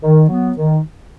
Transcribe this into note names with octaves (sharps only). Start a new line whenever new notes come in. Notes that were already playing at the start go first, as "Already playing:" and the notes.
D#3
F#3 B3
D#3